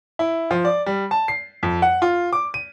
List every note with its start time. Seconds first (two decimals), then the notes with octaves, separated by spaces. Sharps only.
0.19 E4
0.51 F3
0.65 D5
0.86 G3
1.11 A5
1.28 C7
1.63 F2
1.82 F#5
2.02 F4
2.33 D6
2.54 D#7